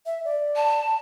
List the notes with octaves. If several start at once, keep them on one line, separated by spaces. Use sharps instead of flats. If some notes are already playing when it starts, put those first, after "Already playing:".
E5
D5
A5